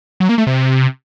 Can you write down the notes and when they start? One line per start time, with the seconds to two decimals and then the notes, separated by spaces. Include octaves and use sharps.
0.20 F#3
0.29 A#3
0.38 A3
0.47 C3